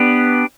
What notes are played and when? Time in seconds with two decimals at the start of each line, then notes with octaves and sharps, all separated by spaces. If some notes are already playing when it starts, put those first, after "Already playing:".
Already playing: B3 D4 G4 B4